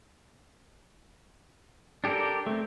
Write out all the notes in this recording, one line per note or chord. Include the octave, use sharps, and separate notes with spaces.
D4 G4 A4 A#4 D5
A3 C4